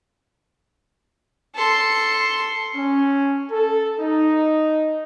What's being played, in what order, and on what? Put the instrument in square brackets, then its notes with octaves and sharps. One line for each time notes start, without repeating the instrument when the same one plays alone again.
[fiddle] A4 C6
[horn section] C#4
A4
D#4